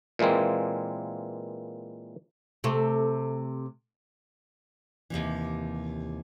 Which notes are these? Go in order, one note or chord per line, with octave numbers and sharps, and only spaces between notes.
A#2 E3 G#3 A#3 C4
C3 A3
D#2 C3 E3